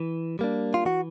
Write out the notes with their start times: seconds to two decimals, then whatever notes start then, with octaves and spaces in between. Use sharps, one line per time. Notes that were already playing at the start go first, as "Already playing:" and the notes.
Already playing: E3
0.39 G3 A#3 D4
0.74 F4
0.85 E3 F#4